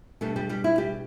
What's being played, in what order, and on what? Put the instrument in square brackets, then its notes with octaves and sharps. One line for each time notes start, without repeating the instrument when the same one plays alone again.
[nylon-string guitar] B2 G3 A3 D4 A4
G3 G4
G3 G4
E4
G3 G4